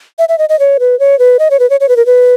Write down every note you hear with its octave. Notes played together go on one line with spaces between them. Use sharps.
E5
E5
D#5
D#5
C#5
B4
C#5
B4
D#5
C#5
B4
C#5
C#5
B4
A#4
B4